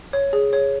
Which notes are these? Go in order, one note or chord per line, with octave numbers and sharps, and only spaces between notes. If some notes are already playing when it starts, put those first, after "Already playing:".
C#5
G#4
C#5